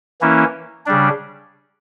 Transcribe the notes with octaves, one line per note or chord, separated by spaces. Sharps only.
E3 A#3 C#4 E4
C#3 G3 D4